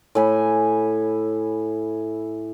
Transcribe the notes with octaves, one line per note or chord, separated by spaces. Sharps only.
A2 G#5 B5